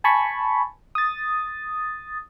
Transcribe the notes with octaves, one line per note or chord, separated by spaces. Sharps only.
G#5 A5 B5 C#6
D#6 A6